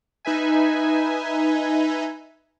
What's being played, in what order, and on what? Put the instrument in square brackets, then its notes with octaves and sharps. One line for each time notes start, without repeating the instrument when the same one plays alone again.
[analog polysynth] D#4 B4 E5 G#5